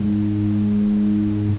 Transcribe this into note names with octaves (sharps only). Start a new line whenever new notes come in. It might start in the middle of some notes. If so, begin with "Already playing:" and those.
Already playing: G#2